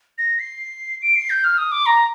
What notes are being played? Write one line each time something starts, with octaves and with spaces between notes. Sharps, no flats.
A#6
C7
D7
C7
G6
F6
D#6
D6
A#5